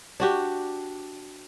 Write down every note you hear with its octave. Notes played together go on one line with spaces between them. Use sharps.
D4 F#4 G4